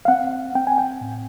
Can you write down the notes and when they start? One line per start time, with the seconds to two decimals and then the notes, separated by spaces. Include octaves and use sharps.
0.05 F5
0.08 C4 F#5
0.55 C4 G5
0.67 G#5
0.78 G5
1.01 A2